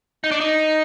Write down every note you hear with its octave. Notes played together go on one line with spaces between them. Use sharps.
D#4
D4
D#4